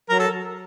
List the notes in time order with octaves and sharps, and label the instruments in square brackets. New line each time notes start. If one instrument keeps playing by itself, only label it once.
[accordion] F#3 [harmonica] A#4
[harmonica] A4